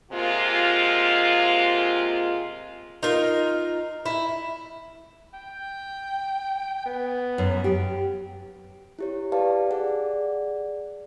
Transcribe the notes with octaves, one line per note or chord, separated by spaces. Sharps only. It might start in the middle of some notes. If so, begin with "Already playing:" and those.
C3 G#3 A#3 F4
D#4 F4 A#4
E4
G5
B3
F#2
G4
E4 G4 C#5
G4 B4 D5 F5 A5
G#4 D5 F#5